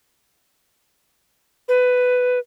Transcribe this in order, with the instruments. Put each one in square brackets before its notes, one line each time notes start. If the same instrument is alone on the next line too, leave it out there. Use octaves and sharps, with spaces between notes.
[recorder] B4